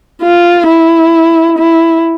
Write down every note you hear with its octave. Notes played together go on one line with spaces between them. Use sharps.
F4
E4
E4